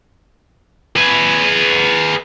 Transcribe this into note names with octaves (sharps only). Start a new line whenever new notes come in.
G#4 B4